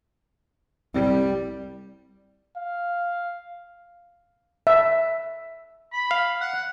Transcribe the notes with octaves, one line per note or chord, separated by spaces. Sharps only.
C2 G3
F5
E5
B5
F5
F#5